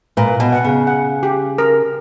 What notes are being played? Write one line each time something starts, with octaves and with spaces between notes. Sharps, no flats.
A#2 B4
B2
F#5
C#3
F#5
G4
A#4